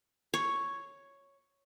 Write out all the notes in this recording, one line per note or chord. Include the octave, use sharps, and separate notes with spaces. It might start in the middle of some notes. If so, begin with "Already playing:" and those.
C#5